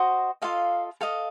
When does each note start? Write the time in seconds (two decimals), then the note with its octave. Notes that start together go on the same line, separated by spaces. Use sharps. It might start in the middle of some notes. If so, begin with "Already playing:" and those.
Already playing: F#4 C5 D#5
0.42 F4 A4 D#5 F5
1.01 A4 D#5 F5